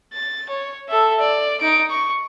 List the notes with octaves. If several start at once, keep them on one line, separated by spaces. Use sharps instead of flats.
A6
C#5
A4 E5
D5
D#4 D7
C#6